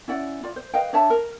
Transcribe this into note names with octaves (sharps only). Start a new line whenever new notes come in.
C#4 E4 D5 F#5
F4 D5
C5
B4 D#5 F5 G5
D4 C#5 E5 A5
A#4